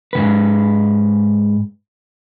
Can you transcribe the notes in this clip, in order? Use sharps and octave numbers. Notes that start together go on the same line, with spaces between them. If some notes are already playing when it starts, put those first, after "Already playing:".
G#2 C3 B4